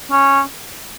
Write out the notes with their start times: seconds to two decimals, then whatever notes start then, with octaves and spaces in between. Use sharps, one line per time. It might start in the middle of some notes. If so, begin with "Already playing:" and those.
0.11 C#4